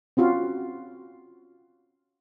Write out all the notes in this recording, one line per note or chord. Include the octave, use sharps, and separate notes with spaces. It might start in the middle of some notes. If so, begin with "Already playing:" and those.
C4 C#4 F4 F#4